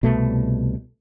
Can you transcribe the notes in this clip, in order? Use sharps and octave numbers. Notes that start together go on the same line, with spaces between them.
C2 B2 A3